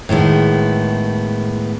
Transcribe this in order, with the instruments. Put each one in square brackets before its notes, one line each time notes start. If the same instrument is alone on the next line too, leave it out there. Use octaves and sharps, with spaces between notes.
[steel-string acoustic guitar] A2 D#3 G#3 B3